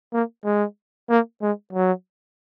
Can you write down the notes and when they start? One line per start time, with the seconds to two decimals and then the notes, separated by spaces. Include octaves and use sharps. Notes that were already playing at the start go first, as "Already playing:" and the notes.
0.13 A#3
0.45 G#3
1.09 A#3
1.42 G#3
1.73 F#3